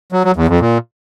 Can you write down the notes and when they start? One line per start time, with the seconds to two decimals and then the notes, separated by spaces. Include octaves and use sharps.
0.12 F#3
0.24 F#3
0.36 E2
0.48 F2
0.60 A#2